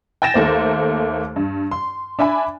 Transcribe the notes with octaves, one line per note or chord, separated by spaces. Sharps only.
G5 G#5 A6 A#6 E7
D#2 A3 A#3 C5
G2
C6
D4 E5 G#5 B5